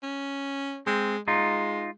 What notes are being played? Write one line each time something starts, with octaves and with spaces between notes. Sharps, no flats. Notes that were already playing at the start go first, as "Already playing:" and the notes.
C#4
G#3 C4
G#3 D#4 F4